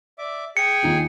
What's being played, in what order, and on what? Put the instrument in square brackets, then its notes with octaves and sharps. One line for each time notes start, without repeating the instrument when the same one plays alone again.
[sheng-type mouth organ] D5 E5 D6
[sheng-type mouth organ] G#4 G5 G#5 [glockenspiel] C#7
[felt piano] D#2 D#4 F4